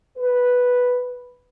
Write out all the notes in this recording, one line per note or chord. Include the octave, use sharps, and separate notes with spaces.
B4